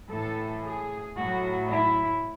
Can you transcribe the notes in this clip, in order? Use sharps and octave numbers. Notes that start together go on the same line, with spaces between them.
A2 E3 A4
G#4
A2 F#3 F#4
E4